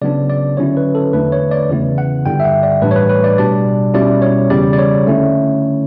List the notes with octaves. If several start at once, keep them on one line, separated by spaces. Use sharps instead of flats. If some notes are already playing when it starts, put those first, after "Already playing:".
C#3 F#3 B3 D4 D5
D5
D3 F#3 C#4 E4 C#5
B4
A4
E2 D3 A3 D4 B4
C#5
D5
E2 C#3 E3 B3 E4
F#5
G2 D3 G3 G5
E5
F#5
D5
A2 E3 G3 D4 B4
C#5
B4
B4
D5
B2 G3 D4 D5
B2 G3 C#4 E4 D5
C#5
E2 C#3 G3 D5
D5
C#5
D3 A3 C#4 E4